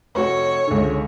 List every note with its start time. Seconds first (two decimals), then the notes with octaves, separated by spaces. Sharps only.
0.15 F1 F#4 C#5
0.68 C#2 D3